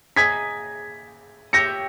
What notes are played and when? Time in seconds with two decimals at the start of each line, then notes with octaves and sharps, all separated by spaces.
0.16 G#4 D#5 A#5 G#6 B6
1.53 G4 C#5 E5 G5 A#6 C#7